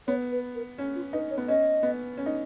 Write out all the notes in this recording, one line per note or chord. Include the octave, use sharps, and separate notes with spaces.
B3 C#5
B4
A#4
C#4
F4
D#4 B4
C#5
B3
C#4 D#5
B3
C#4
D#4